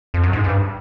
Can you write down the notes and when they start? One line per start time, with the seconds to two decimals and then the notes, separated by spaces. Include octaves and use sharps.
0.14 F2
0.23 F#2
0.33 G#2
0.44 G2